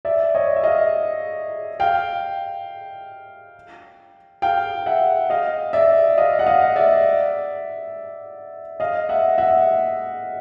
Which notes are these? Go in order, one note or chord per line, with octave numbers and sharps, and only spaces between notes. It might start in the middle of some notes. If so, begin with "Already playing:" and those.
D5 E5
C#5 D#5
E5
D#5 F5
F5 G5
F5 G5
E5 F#5
D#5 F5
D5 E5
D#5 F5
F#5
D#5 F5
D5 E5
D#5 F5
E5 F#5
E5 F#5